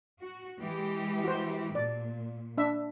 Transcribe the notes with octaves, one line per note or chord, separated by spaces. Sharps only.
F#4
E3 G#3 G4
F#4 C5
A#2 D5
D4 E5